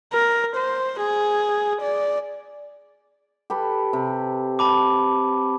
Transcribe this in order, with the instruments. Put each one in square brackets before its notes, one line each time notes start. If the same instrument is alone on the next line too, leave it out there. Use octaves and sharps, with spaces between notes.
[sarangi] A#4
C5
G#4
D5
[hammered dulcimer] G4 A4 B4
C3
[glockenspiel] A5 B5 D6